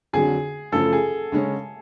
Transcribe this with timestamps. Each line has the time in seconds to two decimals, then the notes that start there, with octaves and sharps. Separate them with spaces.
0.13 F2 D3 F#3 G#4
0.72 F#2 C#3 F3 A3 A4
0.93 G#4
1.32 C#3 G#3 C#4